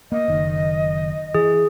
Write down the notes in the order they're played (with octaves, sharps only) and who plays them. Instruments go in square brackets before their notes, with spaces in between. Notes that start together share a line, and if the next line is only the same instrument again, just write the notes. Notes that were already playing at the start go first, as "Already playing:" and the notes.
[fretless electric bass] A#3 [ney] D#5
[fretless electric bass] F#1 D#3
[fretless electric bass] E3 [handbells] G#4